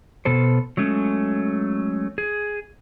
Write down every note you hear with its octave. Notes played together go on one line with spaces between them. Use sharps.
B2 B3 A4 C5
F#3 G#3 A3 C#4
G#4